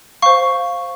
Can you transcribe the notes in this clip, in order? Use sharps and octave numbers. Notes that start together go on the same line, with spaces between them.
C5 F5 C#6